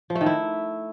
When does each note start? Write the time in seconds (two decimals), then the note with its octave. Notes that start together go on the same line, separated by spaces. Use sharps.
0.10 F3
0.15 A3
0.21 D#3
0.26 E4